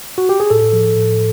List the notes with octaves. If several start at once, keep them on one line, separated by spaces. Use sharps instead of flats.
F#4
G4
G#4
A2 A4
F3
A2